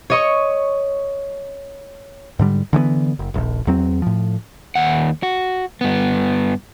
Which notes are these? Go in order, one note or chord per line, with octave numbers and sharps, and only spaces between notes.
C#5 D#5 C#6
G#2 D3 G3
D3 E3 G#3 B3
F#1
D#1 A#1
E2 F#3 C4
A2 F3
D#2 F#5
F#4
G2 B3